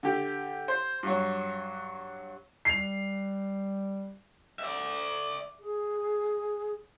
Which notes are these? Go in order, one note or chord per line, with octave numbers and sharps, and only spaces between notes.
D3 G4
C5
G2 F#3
G3 C7 F7
D5 E5
G#4